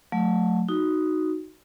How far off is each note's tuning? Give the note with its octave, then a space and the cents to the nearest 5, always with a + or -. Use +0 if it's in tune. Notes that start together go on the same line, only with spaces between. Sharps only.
F#3 -35 A3 +0
D#4 +0 F#4 +0